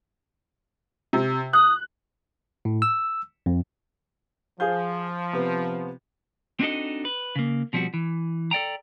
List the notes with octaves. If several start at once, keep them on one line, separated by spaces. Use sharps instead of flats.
C3
D#6 F#6
A2
E6
F2
F3 G#4 F5 G6
C3 B3
C4 D4 D#4 F#4 A4 D#5
B4
C#3 A#3
B2 F3 G3 C4 F#4
E3
A4 D5 G5 A#5